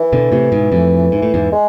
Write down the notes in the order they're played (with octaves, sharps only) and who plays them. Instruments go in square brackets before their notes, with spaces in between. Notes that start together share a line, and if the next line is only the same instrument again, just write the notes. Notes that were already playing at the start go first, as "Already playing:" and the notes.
Already playing: [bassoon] E3
[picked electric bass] B2 D3
A2 C3
G#2 B2
F2 A2
G#2
A2
E2 G#2
[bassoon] G#3